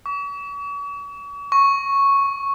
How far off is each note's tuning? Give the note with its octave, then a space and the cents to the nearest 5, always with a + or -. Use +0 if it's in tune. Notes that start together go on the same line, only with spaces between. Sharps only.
C#6 +45
C#6 -5